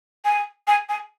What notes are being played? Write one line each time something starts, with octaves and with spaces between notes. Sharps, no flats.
G#5
G#5
G#5